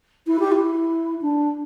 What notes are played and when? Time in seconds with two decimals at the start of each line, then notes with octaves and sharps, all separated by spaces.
0.26 E4
0.39 G4
0.51 E4
1.21 D4